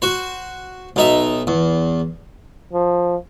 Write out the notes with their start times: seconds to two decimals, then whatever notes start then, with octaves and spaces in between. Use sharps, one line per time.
0.02 F#4 C5
0.96 B1 D#4 E5
1.47 E2
2.73 F3